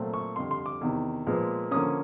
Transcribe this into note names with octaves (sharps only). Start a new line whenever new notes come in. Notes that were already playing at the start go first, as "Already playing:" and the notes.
Already playing: A#2 F#3 A3 C4
C#6
F2 D3 G3 C6
C6
D6
E2 C3 D#3
A#2 F3 G#3 B3
D3 F3 A#3 C#4 D#6